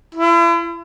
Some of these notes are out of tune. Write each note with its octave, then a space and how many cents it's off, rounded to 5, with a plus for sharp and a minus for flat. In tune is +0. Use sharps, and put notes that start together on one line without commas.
E4 +40